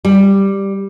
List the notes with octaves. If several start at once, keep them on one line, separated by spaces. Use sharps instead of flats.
G3